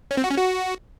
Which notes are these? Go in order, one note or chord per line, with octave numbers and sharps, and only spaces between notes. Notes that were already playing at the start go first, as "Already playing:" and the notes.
C#4
C4
F#4
C#4
F#4